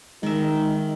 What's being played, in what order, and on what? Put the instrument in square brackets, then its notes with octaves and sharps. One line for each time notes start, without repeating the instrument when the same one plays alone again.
[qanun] D#3 E5 [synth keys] G#3 [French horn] D#4